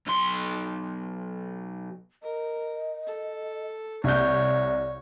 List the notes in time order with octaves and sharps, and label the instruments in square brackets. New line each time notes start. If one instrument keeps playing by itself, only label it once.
[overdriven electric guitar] B1 C6
[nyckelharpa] A#4 [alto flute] D#5
[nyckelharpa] A4
[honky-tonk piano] C2 G6 [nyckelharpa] C#5 [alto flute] D5